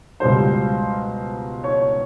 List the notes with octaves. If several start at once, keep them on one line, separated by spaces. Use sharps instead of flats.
C#2 B2 G3 C5
C#5